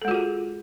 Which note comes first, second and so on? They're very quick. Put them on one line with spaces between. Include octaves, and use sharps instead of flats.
A4 G#3 F#4 F4 G#4